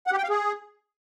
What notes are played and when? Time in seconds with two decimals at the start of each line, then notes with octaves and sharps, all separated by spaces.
0.07 F#5
0.12 G4
0.18 G5
0.24 F5
0.29 G#4